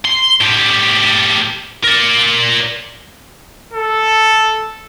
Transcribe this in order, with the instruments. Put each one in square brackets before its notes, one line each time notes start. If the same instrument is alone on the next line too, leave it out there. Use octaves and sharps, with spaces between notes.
[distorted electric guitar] C6
A2 G3
A#4 D5
[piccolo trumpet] A4